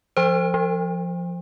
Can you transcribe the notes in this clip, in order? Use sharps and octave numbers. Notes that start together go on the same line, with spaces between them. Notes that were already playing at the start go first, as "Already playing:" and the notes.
F3 C5
F3